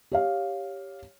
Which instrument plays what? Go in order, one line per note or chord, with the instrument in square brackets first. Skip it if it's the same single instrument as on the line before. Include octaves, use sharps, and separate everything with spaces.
[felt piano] G4 C#5 F5